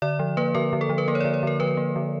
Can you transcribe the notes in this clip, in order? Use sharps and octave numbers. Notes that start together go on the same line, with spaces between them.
D3 D5
F3
A#3 B4
D3 A#4
D3
A4
F3
B4
A#3 A#4
C#5
D3 D5
C#5
D3 A#4
F3 B4
A#3
D3